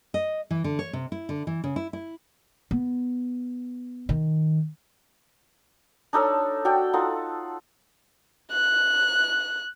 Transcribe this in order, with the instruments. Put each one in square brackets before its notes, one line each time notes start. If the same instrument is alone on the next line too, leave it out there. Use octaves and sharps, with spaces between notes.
[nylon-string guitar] D#5
E3
D3
C#5
C3
E4
D3
E3
C#3
E4
E4
[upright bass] B3
D#3
[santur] D4 D#4 A4 C#5
F#4 A4 D5 G5
D#4 F4 A4 F#5
[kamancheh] F#6